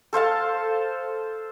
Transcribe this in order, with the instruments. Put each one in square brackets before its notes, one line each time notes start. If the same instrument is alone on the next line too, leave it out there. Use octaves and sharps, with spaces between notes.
[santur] A4 C5 F5 A5